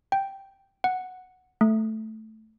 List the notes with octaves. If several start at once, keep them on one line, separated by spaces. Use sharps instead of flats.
G5
F#5
A3